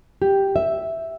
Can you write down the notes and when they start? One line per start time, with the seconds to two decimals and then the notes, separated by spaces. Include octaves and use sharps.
0.22 G4
0.56 E5